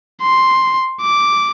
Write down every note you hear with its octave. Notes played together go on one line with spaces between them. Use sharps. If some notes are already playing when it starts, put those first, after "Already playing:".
C6
D6